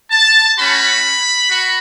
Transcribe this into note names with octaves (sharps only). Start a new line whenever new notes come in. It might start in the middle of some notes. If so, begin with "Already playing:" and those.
A5
A3 C#4 F#4 B5
F#4